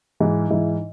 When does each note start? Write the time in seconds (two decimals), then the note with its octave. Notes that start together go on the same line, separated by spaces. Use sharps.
0.20 G#2 E3
0.50 G#2 E3 E4